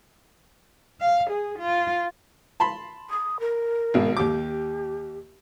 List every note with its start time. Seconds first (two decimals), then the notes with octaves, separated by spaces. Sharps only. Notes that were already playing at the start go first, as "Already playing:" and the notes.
1.00 F5
1.30 G#4
1.59 F4
2.60 A5 B5 C6
3.10 D#6
3.40 A#4
3.94 G#1 B2
4.17 D#2 G4 D6